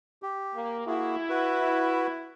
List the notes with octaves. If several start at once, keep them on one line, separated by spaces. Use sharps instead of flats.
G4
A#3
A#3 E4 F#4 G#4
F#4 B4